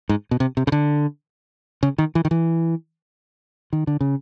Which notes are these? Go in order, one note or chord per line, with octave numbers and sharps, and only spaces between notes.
G#2
B2
C3
C3
C#3
D3
C#3
D#3
E3
D#3
E3
D#3
D3
C#3